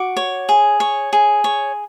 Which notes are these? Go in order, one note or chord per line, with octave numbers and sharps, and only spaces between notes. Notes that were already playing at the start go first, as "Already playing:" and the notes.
Already playing: F#4 D6
C#5
G#4
C#5
G#4
C#5